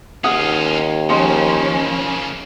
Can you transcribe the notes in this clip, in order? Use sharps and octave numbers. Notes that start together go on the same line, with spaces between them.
D#2 C#4 F4 F#5 D#6
C#3 F3 A#3 C#4 D#5 C6